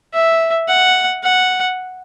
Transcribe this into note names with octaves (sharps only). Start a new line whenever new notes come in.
E5
F#5
F#5